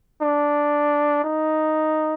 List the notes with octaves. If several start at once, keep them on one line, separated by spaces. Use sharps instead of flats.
D4
D#4